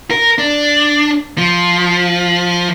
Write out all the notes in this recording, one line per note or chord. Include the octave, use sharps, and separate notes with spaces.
A#4
D4
F3